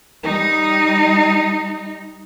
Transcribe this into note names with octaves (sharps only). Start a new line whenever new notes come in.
G3 D#4